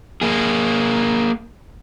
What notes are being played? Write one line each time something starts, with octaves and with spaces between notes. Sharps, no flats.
A#3 G#4